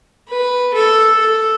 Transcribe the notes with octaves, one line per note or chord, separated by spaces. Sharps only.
B4
A4
A4